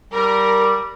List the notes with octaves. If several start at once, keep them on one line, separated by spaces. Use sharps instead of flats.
G3 A#4